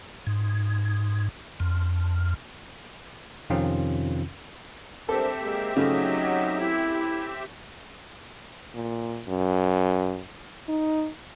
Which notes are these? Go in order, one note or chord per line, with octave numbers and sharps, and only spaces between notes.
G#2
F2
F2 C3 D#3 C4 C#4 F4
C4 D4 G4 A4 A#4 C5 E5
G#3 A#3 G#4
C#3 F#3 A3 D#4 D#5
E4
A#2
F#2
D#4